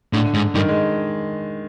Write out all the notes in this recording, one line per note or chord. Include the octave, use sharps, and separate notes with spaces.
A2 D3
G#2
G2 D#3
G#3